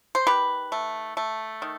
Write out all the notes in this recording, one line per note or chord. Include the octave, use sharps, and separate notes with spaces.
C5
D#3 G4 B4
A3
A3
D#3